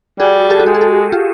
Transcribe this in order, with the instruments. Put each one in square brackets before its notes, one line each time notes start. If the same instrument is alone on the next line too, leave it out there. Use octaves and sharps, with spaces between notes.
[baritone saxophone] G3 [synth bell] F#4 G#4
[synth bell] G4 A4
F#4
[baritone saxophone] G#3 [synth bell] G4
[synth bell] G#4
G4 A4
F4 G4